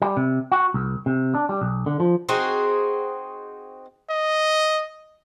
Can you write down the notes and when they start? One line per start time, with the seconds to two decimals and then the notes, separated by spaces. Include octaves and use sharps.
0.02 G3
0.17 C3
0.52 F#4
0.74 C2
1.06 C3
1.35 D4
1.49 G3
1.61 B1
1.86 D3
2.00 F3
2.29 C4 D#4 F#4 G#4
4.11 D#5